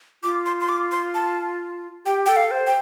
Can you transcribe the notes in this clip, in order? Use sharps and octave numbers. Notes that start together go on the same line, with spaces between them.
F4 D6
C6
C6
D6
C6
A5
G4 G5
A4 G5
F5
C5
G5